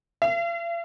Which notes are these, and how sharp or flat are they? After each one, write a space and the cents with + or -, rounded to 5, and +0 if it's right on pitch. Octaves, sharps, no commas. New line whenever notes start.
F5 -45